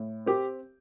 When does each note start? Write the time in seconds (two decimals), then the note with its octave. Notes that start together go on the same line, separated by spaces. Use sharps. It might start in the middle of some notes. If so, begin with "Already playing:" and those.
Already playing: A2
0.26 C4 G4